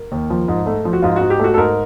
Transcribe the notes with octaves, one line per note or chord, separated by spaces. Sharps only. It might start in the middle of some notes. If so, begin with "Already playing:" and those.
Already playing: A#4
D#2
F3
G#2
A3
F3
F#4
G#2 F4
F#4
G#2
G4
A3 F#4
A4
G#2 A#4